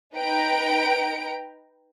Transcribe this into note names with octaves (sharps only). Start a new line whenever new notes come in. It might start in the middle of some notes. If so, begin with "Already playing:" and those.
D#4 B4 G5 A#5 D7